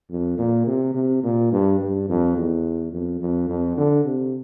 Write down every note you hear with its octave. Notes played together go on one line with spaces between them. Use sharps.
F2
A#2
C3
C3
A#2
G2
G2
F2
E2
F2
F2
F2
D3
C3